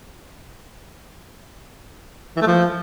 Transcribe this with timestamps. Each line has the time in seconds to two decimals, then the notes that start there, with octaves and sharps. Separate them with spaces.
2.36 E3
2.41 A3
2.47 F3